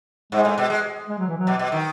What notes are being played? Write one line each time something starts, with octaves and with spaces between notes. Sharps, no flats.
G#2 G#3
A2
B2
G#3
G#3
F#3
E3
F#3
B2
B2
D#3